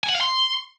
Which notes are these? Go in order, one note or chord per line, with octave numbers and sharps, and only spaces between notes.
G#5
F#5
F5
C6